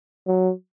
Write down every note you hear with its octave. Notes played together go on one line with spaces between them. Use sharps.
F#3